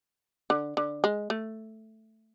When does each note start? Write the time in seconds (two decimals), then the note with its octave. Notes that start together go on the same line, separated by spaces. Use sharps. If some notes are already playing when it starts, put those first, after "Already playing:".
0.50 D3
0.77 D3
1.04 G#3
1.30 A3